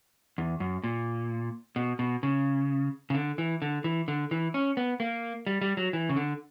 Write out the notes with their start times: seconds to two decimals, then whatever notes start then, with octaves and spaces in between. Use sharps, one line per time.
0.38 E2
0.60 F#2
0.84 A#2
1.76 B2
1.99 B2
2.23 C#3
3.10 C#3
3.15 D3
3.38 E3
3.62 D3
3.84 E3
4.08 D3
4.31 E3
4.54 C#4
4.77 B3
5.00 A#3
5.47 G3
5.61 G3
5.77 F#3
5.93 E3
6.09 C#3
6.16 D3